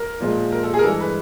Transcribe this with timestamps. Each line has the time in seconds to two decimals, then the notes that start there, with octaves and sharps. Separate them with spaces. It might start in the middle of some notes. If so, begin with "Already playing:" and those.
Already playing: A#4
0.20 A#2 F3 G#3
0.52 A#4
0.63 A4
0.74 G#4
0.79 A#4
0.83 G2 E3 G#3 A4
1.00 B4